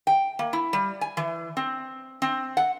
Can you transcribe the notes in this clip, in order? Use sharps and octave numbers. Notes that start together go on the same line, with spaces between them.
G5
A#3
E4
G3
G#5
E3
C4
C4
F#5